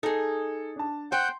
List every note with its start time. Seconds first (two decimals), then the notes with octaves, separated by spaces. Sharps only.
0.03 D#4 G#4 A4
0.76 D4 A5
1.12 C5 F#5 G5 C6 G6